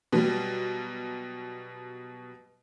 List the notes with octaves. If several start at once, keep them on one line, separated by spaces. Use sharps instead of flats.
B2 F#3 G3